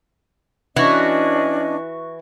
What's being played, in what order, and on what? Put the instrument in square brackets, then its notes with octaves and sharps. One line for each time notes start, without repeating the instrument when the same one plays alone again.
[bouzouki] E3 F#4 [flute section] C#4 D4 D#5